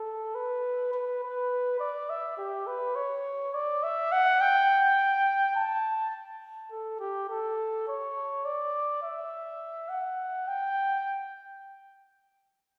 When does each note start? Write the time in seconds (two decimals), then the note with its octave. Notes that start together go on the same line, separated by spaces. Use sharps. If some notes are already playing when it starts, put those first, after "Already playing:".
Already playing: A4
0.35 B4
0.93 B4
1.23 B4
1.80 D5
2.09 E5
2.38 G4
2.67 B4
2.95 C#5
3.54 D5
3.83 E5
4.12 F#5
4.41 G5
5.55 A5
6.71 A4
7.00 G4
7.29 A4
7.88 C#5
8.45 D5
9.03 E5
9.89 F#5
10.48 G5